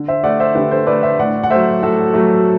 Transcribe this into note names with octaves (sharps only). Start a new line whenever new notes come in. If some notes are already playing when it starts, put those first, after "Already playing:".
Already playing: D3
C5 E5
A3 D5 F#5
C5 E5
D3 G4 B4
A4 C5
A3 B4 D5
C5 E5
A2 D5 F#5
F#5
F#3 A3 C5 E5
A2 F#4 A4
F#3 A3